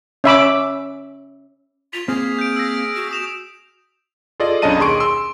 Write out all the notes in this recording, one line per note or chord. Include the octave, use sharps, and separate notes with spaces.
C#4 E5 B5 D6
F4 B6 F7
A#3 C4 G#4 F6
G6 D7
E6 A#6
F#4
D#6 E7 F7
F4 G#4 A4 D5 D#5
B1 C#4 D4 D#5 A5 D#7
D#2 D#3 G#4 C6 C#6 D7
C6 E6